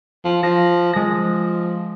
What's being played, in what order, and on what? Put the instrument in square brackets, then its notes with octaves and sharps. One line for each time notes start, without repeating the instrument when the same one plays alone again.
[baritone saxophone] F3
[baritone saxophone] F3 [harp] A#6
[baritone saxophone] F3 [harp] G#3 A#6